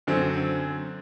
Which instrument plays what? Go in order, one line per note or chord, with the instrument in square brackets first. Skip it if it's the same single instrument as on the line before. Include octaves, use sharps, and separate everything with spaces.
[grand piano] F#2 D3 F#3 C4